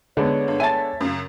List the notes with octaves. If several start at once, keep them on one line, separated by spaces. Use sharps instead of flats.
D3 G#3 B3 C#5
G2
E5 G#5 A5 A6
F#2 C#3